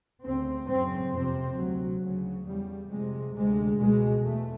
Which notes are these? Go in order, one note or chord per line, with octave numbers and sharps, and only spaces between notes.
D2 C#3 C4
F#2 C#3 C4
F2 C3 C4
D2 C3 F#3
D2 C#3 F#3
E2 C#3 G3
F2 C3 G#3
D2 C3 G#3
C#2 B2 G#3
E2 A3